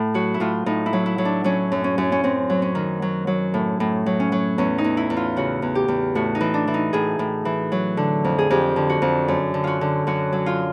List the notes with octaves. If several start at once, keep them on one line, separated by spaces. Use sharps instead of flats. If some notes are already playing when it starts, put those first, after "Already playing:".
Already playing: A2
F#3 F#4
E4
A2 F4
A2 D#4
E4
F#3
E4
F#3
D4
F#3 C#4
F#2
C#4
F#2
C#4
F#2 C4
F#3
C#4
D#3
F#3
F#3
A2
A2
F#3
C#4
F#3
E2 C#4
D#4
E2
E4
E2
F4
C#3 F#4
E2
G4
E2
A2 F#4
D#4
E3
D4
E3
D#4
A2 G#4
A2
E3
F#3
D3
F2
G#4
F2 G4
D3
F#4
F2
F#2
D3
F4 F#4
D3
F#2 F#4
F#3
F4